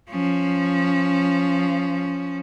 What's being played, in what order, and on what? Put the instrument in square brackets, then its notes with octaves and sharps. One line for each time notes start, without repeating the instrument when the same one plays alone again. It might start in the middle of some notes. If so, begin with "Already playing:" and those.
[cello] F3 C#4